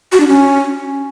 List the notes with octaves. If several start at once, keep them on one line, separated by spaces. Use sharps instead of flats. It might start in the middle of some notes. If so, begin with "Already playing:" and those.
F#4
D4
C#4